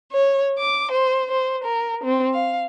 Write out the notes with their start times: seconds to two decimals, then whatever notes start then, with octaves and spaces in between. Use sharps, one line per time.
0.12 C#5
0.58 D6
0.91 C5
1.31 C5
1.63 A#4
2.04 C4
2.34 F5